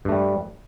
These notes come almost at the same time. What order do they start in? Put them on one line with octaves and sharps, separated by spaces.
G2 A3 G3